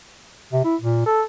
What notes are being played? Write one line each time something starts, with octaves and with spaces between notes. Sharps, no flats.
C3
E4
A#2
A4